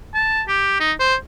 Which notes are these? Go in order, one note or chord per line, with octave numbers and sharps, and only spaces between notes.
A5
G4
D#4
C5